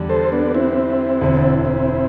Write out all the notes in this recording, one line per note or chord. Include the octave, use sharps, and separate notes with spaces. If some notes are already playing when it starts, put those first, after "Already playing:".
Already playing: E2 D3 G3 D4
A4 C5
B3 D4
C4 E4
E1 D2 D3
C4 E4